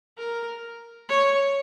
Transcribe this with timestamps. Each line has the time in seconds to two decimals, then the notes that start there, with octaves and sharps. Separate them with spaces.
0.17 A#4
1.09 C#5